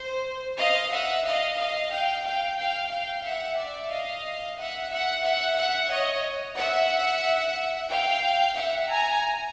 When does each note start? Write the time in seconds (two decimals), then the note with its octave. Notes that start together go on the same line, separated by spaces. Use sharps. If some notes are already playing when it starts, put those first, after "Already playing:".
Already playing: C5
0.58 D#5 F5
0.91 E5 F#5
1.24 D#5 F5
1.58 D#5 F5
1.91 F5 G5
2.25 F5 G5
2.58 F5 G5
2.91 F5 G5
3.24 E5 F#5
3.58 D5 E5
3.91 D#5 F5
4.57 E5 F#5
4.90 E5 F#5
5.23 E5 F#5
5.58 E5 F#5
5.90 C#5 D#5
6.57 E5 F#5
7.90 F5 G5
8.56 E5 F#5
8.90 G#5 A#5